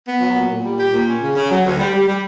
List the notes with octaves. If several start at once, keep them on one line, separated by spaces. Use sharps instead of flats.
B3
F#3
A#2
A#2
G3
G4
A#2
C#4
C#3
C#3
F#3
D2
G3
G3
G3